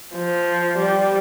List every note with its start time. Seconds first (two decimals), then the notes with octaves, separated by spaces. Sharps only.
0.15 F3
0.79 G3